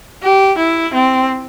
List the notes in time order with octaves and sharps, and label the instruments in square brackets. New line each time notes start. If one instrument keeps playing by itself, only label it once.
[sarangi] G4
E4
C4